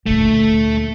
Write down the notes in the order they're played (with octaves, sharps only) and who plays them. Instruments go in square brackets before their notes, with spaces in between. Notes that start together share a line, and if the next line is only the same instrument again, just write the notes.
[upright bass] D2 A#2 [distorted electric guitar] A3